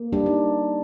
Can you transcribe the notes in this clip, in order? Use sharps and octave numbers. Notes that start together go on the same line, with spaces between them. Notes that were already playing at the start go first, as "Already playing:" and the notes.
Already playing: A#3
G3 D4
D#4